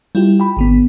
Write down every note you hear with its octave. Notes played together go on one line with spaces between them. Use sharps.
G3 E4 F4 G4
G5 B5
G#1 D3 B3